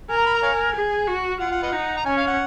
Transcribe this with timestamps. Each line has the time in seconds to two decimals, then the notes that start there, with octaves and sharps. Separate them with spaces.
0.09 A#4 G#5
0.17 A#5
0.26 B5
0.34 A#5
0.43 C#5 F5 G#5
0.75 G#4
1.07 F#4
1.40 F4 F#5
1.52 F#5
1.63 B4 D#5 F#5
1.73 D#4
1.97 A#5
2.06 C#4 G#5
2.17 F5
2.27 F#5